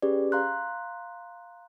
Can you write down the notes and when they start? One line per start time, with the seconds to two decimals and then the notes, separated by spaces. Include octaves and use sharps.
0.02 C#4 G4 G#4 B4 D5
0.32 F5 A#5 C6 F#6